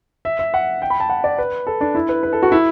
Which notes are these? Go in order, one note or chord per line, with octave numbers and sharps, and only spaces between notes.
E5
E5
F#5
G5
B5
A5
F#5
D5
B4
A4
D4
E4
B4
B4
A4
F#4
E4